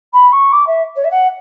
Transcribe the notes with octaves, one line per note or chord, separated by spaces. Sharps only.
B5
C#6
D6
E5
C#5
E5
F#5